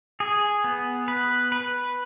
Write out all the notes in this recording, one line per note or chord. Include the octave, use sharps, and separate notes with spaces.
G#4
B3
B4
B4